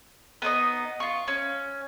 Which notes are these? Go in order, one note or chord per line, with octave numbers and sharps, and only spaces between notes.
B3 D#4 B4 D#5
F4 C#6
C#4